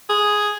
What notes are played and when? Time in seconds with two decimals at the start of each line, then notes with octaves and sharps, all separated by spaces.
0.10 G#4